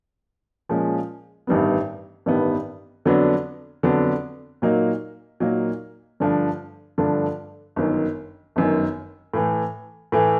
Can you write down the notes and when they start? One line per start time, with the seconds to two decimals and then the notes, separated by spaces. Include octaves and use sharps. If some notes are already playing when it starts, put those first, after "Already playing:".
0.69 A#2 F3 G#3 C#4
1.47 A1 G2 D#3 G3 B3
2.26 A1 G2 D#3 G3 B3
3.05 F2 D3 F#3 B3 D4
3.83 F2 D3 F#3 B3 D4
4.62 A#2 F#3 A#3 D#4
5.40 A#2 F#3 A#3 D#4
6.20 G2 D3 F3 A3 D4
6.98 G2 D3 F3 A3 D4
7.76 G1 F#2 D#3
8.56 G1 F#2 D#3
9.34 A2 E3 A3
10.12 A2 E3 A3